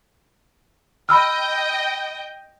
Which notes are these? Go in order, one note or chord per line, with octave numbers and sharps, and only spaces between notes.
D#5 G5 B5 E6 F6